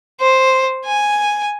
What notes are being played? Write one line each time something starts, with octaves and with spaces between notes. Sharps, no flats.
C5
G#5